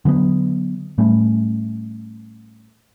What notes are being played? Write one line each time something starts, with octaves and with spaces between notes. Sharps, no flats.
D3 F#3 A3 B3
A2 G3 A3 C#4